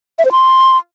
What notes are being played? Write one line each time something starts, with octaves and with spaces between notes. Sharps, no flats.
E5
C5
C6